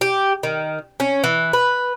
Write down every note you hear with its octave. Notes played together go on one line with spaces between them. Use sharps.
G4
D#3
C#4
E3
B4